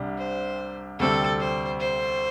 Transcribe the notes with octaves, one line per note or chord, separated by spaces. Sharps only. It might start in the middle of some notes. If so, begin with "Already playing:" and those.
Already playing: C2 C3 G3 D4
C5
D2 C3 G3 C4 A4
C5
C5